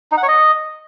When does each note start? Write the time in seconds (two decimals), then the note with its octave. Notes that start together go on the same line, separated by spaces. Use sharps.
0.12 D#4
0.17 F#5
0.23 C#5
0.28 D#5